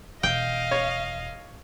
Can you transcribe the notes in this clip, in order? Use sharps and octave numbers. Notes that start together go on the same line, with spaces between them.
E1 D#5 F5 G5
C#5